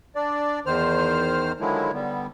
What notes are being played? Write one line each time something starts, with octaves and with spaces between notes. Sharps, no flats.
D4 D5
E2 D#3 C5 F6
D3 D#3 F3 F#3 G#3 E4
D3 G3 B3